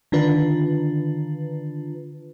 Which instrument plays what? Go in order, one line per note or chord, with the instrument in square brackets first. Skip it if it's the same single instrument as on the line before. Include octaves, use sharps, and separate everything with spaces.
[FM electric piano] D3 D#3 D4 F4 B4